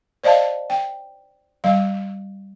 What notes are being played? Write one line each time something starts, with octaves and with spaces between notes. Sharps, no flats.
C5 D5 D#5 F5 A5
G5
G3 F5